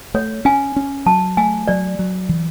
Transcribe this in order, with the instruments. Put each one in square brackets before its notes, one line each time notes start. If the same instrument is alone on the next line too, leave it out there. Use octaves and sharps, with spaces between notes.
[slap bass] A3 [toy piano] C#5
[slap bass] C#4 [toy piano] G#5
[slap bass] C#4
[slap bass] F#3 [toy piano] A5
[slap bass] A3 [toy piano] G#5
[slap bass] F#3 [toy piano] D5
[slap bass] F#3
E3